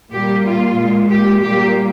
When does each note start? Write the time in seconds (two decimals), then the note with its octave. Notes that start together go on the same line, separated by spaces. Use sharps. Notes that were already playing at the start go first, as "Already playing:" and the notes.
0.11 A#2 G3 A#3 G4
0.44 F4
0.76 A#2 G#3
1.09 G4
1.41 A#2 G3 A#3 G4